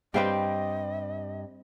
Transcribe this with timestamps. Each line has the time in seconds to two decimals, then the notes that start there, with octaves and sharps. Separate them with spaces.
0.14 G2 G3 C4 G4 B4 D#5 F5 G5